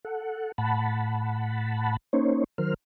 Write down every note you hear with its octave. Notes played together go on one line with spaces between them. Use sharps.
A4 F#5
A2 F#5 A5 B5
A#3 C#4 D#4 C5 C#5
D#3 F#3 A#4 C5 F6